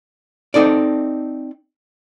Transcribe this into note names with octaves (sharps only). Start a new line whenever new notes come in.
C4 D#4 A4 D5